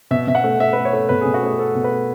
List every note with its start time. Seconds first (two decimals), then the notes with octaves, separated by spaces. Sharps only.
0.11 B2 E5
0.27 B2 E5
0.35 F#5
0.44 A3
0.60 A3 E5
0.73 A3 B4
0.85 C#5
0.93 A3
1.09 B2 B4
1.21 G#4
1.25 B2
1.34 F#4
1.43 A3 G#4
1.59 A3 A4
1.75 B2
1.84 B4
1.91 A3